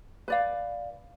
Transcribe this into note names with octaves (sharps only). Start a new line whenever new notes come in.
B4 D5 F5